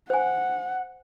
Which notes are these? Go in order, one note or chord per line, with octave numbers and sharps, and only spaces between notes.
C5 F#5 G#5